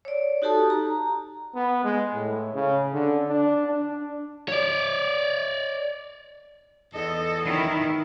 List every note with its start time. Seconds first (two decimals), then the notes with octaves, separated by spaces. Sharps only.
0.05 C#5 D5
0.42 D#4 F#4 G4 A4 A5 D#6
0.70 A#5
1.55 B3
1.84 G#3
2.15 A2
2.55 C#3
2.94 D3
3.29 D4
3.67 D4
4.48 C#5 D5
6.94 E2 A4 D#5
7.44 D#3 E4